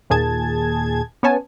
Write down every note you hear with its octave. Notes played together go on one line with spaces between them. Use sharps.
D#2 A#2 G#4 A5 G#6
B3 C#4 C#5 G#5 A5